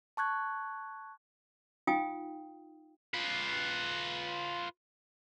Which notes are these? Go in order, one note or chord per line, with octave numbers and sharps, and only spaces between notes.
A5 C#6 F#6 G#6
D#4 F4 F5 G5 G#5 D#6
F4 B4